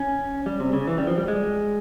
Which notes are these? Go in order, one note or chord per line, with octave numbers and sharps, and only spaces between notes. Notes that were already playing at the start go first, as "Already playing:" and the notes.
Already playing: C#4
G3
C3
C#3
E3
G3
F3
G3
G#3